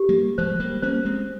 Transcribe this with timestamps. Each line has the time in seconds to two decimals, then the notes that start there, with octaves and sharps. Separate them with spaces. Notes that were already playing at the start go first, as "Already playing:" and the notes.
Already playing: G4
0.09 G3 A#3
0.38 F3 G#3 C5
0.60 G3 A#3
0.82 A#3 C#4 C5
1.05 G#3 C4